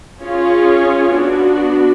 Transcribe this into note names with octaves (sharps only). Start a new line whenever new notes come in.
C#4 F4 G#4 C#5
B3 D4 F#4